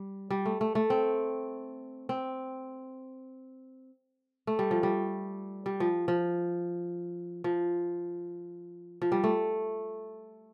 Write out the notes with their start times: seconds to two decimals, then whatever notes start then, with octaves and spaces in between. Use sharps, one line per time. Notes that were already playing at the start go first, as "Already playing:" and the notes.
Already playing: G3
0.30 G3
0.46 A3
0.61 A3
0.75 A3
0.90 C4
2.09 C4
4.47 A3
4.59 G3
4.71 F3
4.83 G3
5.66 G3
5.80 F3
6.08 F3
7.44 F3
9.02 F3
9.12 G3
9.24 A3